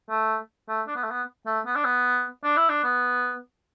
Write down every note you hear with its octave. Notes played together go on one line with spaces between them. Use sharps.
A3
A3
D4
B3
A3
B3
A3
B3
D4
B3
D4
E4
D4
B3